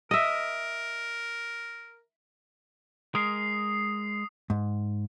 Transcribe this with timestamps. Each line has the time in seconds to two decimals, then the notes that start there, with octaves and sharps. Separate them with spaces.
0.11 A#4 D#5 E5
3.15 G#3 A#4 D#6 C7
4.50 G#2